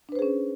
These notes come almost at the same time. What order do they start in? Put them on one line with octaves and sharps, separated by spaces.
D4 B4 C5 G#4 C#4